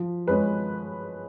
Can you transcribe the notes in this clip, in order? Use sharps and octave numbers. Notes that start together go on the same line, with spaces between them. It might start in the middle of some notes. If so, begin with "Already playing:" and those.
Already playing: F3
G#3 C#4 B4